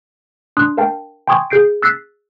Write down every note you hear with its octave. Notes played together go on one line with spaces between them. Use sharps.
D4 C6 D#6 F#6
A#4 F5 G5 A5
G5 G#5 C6 C#6 D#6 G#6
G#4 G6 C7 D7
E6 F#6 A6 B6 C7